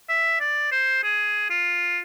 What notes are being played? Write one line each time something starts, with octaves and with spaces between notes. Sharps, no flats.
E5
D5
C5
G#4
F4